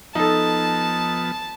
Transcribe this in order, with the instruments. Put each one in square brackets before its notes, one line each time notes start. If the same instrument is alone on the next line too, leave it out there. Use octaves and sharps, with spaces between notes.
[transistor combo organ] F3 B3 [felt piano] D#4 A4 [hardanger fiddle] A5